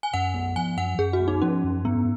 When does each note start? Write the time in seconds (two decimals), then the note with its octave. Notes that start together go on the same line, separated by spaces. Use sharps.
0.03 G#5
0.13 F#2 F#5
0.34 B3
0.55 F3 G#5
0.77 F#2 F#5
0.98 F#2 G#4
1.13 F#4
1.20 B3
1.28 D#4
1.42 F3 C#4
1.64 F#2
1.84 G#2 B3